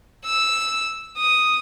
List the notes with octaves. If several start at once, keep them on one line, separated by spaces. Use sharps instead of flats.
E6
D#6